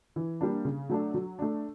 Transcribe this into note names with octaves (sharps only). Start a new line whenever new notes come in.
E3
G3 A#3 D4
C#3
F#3 A3 D4
F#3
A3 D4